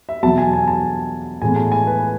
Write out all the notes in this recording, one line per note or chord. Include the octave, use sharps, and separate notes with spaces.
E5
E2 B2 F#3 A5
G#5
G#5
A5
A2 E3 G#3 B3 G#5
A5
G#5
B4